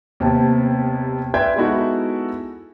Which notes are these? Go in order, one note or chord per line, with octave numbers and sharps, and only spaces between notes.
D#2 C3 B3 A5
B4 D5 E5 G5 C6 G#6
G#3 B3 D#4 E4 F#4 A4